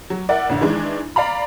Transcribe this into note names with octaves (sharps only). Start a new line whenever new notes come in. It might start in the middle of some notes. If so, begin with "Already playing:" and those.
F#3
E4 A#4 D5 E5 F#5
A1 D3
D#3 E3 G#3 D4
D5 F5 A#5 B5